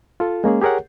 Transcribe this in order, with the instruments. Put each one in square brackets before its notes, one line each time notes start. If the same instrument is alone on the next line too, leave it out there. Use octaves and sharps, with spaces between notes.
[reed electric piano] F4 A4
G#3 A#3 C#4 G#4
G4 G#4 A#4 C#5 F#5